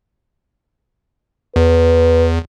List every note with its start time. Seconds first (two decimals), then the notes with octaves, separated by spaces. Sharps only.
1.56 E2 B4